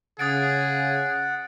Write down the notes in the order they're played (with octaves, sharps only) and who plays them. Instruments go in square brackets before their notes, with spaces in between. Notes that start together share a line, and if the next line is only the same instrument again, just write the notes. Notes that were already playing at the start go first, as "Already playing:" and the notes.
[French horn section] C#3 [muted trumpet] G#4 [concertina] F#5 [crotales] D#6 A6 D7